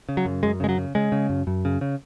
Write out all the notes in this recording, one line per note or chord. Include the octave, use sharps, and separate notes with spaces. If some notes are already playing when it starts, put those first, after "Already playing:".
C#3
F#3
F#2
F#2 G#3
C#3 G#3
F#3
C#3
C#3 G#3
C#3
F#2
F#2
C#3
C#3